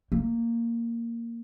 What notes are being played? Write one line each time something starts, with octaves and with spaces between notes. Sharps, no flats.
A#3